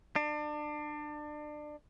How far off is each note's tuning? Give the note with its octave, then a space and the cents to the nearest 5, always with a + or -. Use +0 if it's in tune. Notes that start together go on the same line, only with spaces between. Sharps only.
D4 +30